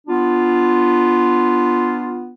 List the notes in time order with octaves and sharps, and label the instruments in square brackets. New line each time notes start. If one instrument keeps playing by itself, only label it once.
[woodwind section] B3 D4 F4